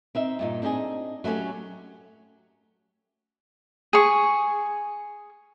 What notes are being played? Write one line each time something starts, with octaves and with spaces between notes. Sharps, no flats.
C4 D#4 E5
G2 A#2 D#4
C4 D4 D#4 G4 G#4
F#3 A3 B3 C#4 G4
G#4 C#6